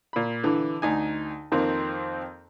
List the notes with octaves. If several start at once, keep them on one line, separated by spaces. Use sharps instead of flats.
A#2 B5
D3 E3
D2 D#4 G#5
F2 D#3 A#3 C4